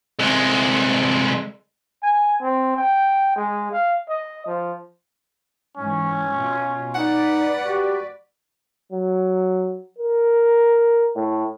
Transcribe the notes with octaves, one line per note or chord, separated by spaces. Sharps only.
C2 G#3
G#5
C4
G5
G#3
F5
D#5
F3
G#2 E3 C#4
B2 F4
D#4 B4 D5 F#5
F#4 G4
F#3
A#4
A2